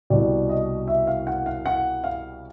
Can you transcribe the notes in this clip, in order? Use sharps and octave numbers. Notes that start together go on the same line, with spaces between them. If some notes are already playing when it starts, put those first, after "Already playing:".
C2 B2 G3 D5
D#5
E5
F5
F#5
F5
F#5
F5